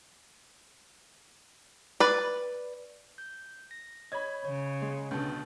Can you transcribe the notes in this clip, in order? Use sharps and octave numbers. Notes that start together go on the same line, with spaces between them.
B4 D5
G6
A#6
C#5 D#5 B5 G#6
C#3 C#5
G#3
C#2 B2 D3 A5 G6